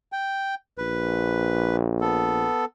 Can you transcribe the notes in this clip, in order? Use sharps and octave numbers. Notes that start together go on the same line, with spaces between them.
G5
A#1 B4
B3 A4